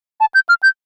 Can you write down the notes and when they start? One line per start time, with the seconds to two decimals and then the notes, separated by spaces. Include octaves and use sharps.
0.21 A5
0.35 G6
0.49 F6
0.63 G6